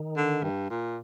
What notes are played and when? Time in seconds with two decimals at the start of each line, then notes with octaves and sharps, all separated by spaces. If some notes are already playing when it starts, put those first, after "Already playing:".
Already playing: D#3
0.17 D3
0.43 G2
0.70 A#2